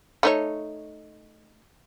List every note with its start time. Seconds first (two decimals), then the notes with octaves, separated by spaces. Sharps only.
0.23 A3 D#4 C#5